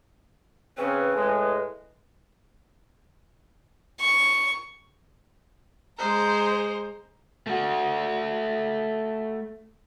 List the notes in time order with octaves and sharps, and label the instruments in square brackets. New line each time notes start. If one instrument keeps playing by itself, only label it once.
[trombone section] C#3 C4 C#4 [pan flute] B4
[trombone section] A2 G#3
[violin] C#6
[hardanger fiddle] G#3 A#5 [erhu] C5
[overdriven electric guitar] A3 F#4